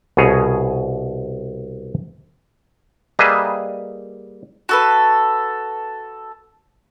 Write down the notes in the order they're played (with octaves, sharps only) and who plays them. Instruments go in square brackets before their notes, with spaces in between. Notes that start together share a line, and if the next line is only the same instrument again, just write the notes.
[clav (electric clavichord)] C2 B2 G#4 C#5
G3 A#3 G#4 B4 D#5 E5
[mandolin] F#4 A4 B4